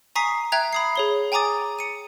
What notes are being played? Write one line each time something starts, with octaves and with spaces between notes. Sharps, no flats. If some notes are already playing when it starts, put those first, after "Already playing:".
G#5 A#5 C#6 D#6 B6 C7
E5 G5 A#5 F#6 G#6 F7
B5 D#6 C7
G#4 C#5 G7
G5 G#5 A#5 D6 D#6 A6
C#7 D#7